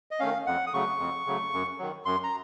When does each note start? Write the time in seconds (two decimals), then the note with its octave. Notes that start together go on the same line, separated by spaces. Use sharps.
0.11 D#5
0.20 D#3 A3 C#4 F5
0.47 F2 F#5
0.67 D#6
0.73 C#3 F#3 A3 C#6
1.00 F2
1.26 C#3 F#3 A3
1.53 F#2
1.79 D#3 F#3
2.05 F#2 C6
2.24 A#5